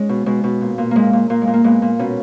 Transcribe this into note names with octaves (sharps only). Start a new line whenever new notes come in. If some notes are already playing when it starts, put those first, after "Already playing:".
Already playing: G#3 C#4 D#4
B2
B2 G#3
B2
A#2
A#2
A#2 G#3 A#3
A#2
A#2 A#3
G#3
A#2
A#3
A#2 G#3 B3
A#2
B2 A#3 C#4